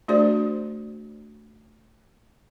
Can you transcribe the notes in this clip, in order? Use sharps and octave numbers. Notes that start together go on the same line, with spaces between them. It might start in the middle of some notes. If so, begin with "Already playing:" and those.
A3 D4 F#4 G#4 C5 D5